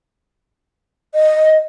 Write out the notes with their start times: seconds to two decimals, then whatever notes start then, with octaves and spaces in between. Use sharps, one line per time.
1.15 D#5